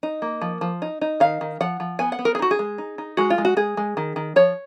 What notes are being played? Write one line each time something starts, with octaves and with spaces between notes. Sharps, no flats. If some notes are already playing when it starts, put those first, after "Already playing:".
D#4
A#3
F3
F3
D#4
D#4
D#3 F5
D#3
F3 F#5
F3
B3 G#5
F#5
B3
A#4
G#4
D#4 F#4
G#4
G#3
D#4
D#4
G#3 F#4
F4
G#3
F#4
G#3 G#4
G#3
D#3
D#3
F3 C#5